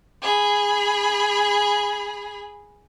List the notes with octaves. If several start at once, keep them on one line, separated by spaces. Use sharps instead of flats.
G#4 B5